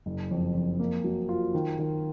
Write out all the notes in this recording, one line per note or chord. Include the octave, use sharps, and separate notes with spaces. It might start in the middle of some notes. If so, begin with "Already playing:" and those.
F#1
F2
F2
A#3
F#3
F4
D#3
D#3